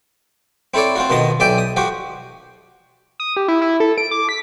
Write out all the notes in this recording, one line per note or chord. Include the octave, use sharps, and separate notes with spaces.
C4 E4 A4 C#5 D5
C4 F4 F#4
B2 D#3 F3 D#5 A5 D#6
B1 D5 E5 G5 G#5
D#6
F3 F#4 G4
D#6
G4
E4
E4
A4
D7
D6
B6